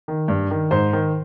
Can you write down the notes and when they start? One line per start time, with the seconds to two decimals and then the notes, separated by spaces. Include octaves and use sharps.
0.08 D#3
0.28 G2
0.51 D#3
0.71 G#2 C5
0.93 D#3